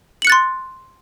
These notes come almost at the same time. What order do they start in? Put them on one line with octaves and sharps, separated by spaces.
F#7 C#7 F#6 A6 C6